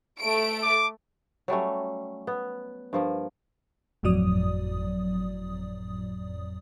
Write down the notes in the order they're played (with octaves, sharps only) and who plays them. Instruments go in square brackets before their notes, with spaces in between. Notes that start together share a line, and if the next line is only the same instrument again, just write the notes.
[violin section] A3 D7
[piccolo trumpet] D6
[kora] F#3 G3 A3 C#4
B3
G2 F3 A#3
[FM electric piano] G1 F2 A2 F#3 D5 D#6